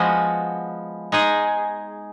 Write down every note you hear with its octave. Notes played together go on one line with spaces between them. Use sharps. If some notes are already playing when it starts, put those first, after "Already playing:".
Already playing: F3 G#3 B3 F#4
G#3 D#4 G#4